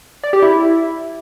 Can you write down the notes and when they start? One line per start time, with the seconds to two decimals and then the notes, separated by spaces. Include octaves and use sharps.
0.24 D5
0.33 G4
0.43 E4